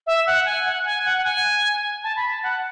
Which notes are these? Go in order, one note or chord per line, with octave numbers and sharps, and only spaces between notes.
E5
F#5
G#5
F#5
G#5
F#5
F#5
G#5
A5
B5
A5
F#5